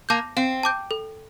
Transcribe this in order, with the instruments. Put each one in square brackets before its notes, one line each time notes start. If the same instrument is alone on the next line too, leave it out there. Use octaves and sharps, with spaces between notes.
[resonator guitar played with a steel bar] A#3 [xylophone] A5 D6 G6
[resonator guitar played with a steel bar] C4 [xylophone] F5
[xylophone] A5 D6 G6
A4